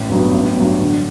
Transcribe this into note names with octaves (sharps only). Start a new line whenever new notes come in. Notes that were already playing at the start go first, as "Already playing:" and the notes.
Already playing: A1
G2 F#3 B3
A1
G2 F#3
D3